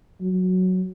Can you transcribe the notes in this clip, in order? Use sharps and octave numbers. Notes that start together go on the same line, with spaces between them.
F#3